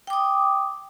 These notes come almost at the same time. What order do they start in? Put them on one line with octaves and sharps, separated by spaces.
G5 D6 D#6